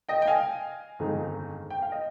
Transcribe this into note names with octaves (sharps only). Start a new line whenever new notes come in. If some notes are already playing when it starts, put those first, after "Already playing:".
D#5 G5
G5
F5 G#5
G1 F2 D#3 G#3 D#4
G5
F5
D#5